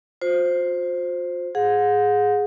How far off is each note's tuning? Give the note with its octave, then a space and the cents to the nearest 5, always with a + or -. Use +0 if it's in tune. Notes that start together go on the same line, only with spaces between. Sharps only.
F4 +40 C5 +0
G#4 +0 F#5 -35